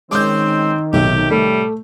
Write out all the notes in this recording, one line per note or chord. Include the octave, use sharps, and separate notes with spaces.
D#3 G#3 C4 C#4 D6 G6
B1 A2 C3 G4
G3 A3